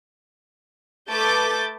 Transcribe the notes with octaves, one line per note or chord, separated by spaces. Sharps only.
A3 A4 B4 D6 G6 A6